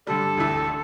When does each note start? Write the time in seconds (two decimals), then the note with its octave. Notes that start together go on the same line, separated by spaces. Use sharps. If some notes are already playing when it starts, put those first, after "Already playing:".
0.07 G2 D3 G3 D4 A4
0.36 E1 D2 D3 A3 E4
0.67 D3